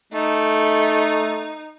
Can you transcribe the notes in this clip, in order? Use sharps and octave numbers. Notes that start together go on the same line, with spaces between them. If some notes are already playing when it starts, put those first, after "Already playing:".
A3 D#4